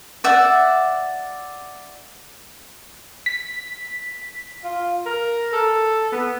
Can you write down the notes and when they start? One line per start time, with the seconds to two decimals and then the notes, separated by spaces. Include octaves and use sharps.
0.24 D5 E5 F#5
3.26 B6
4.64 F4
5.06 A#4
5.53 A4
6.12 B3